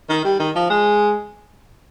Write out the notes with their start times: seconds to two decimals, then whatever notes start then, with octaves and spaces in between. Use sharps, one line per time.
0.09 D#3
0.24 G3
0.39 D#3
0.55 F3
0.70 G#3